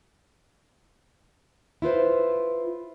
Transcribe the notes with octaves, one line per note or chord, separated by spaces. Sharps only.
E4 F4 B4 C5